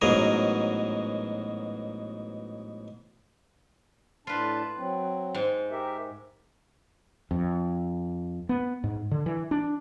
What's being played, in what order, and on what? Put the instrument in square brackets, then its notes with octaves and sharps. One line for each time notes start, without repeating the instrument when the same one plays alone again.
[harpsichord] A1 G#2 B2 F#3 G#4 A#4
[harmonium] A2 D4 A5 [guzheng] F4 B4
[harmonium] F#3 C4
[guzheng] G#2
[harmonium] G4 A#4 E5
[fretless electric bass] F2
B3
G#2
D3
E3
D4